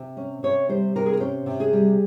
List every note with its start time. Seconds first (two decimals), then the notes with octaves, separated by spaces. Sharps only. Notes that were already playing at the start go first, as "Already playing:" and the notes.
Already playing: C3
0.17 C#4
0.43 C3 C#5
0.69 G3 C5
0.95 C3 A#4
1.06 G#4
1.13 A#4
1.20 C#4 C5
1.46 C3
1.60 G#4
1.73 G3